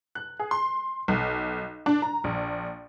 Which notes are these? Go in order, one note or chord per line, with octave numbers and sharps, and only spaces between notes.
F#6
G#4
C6
B1
D4
A#5
A#1